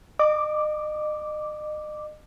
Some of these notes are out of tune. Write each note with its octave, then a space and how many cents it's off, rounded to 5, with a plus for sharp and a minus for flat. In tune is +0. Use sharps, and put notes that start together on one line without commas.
D#5 -35 D6 +0